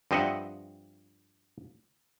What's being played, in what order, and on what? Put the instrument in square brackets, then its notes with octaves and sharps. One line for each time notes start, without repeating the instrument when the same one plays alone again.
[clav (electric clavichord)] G2 F3 C4 D#5 E5 F#5